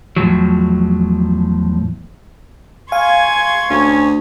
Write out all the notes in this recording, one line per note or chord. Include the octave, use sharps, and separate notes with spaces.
E2 A2 F3 F#3
F5 G#5 C6 C#6 G#6
D2 C#4